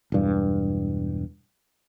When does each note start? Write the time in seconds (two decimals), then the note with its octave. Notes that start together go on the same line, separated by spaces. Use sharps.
0.12 E1 G2